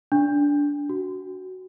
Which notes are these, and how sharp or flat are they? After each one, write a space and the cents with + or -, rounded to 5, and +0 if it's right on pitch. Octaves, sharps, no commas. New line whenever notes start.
D4 -15
F#4 +10